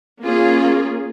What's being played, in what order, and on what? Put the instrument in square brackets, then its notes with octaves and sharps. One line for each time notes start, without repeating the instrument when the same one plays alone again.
[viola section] A#3 C#4 F4 G#4